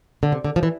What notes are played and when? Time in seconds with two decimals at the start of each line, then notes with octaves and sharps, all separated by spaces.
0.23 D3
0.32 C3
0.45 D3
0.56 F3
0.63 E3